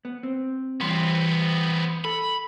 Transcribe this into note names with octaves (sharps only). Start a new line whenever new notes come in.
B3
C4
E3 G3 B3 C4 C6
A4 B5